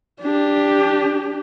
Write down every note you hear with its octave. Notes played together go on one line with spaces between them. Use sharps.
D4 G4